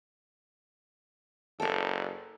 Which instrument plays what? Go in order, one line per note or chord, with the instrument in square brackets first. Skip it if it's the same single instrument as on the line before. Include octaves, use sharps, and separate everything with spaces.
[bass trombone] F#1 [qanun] A4 A#4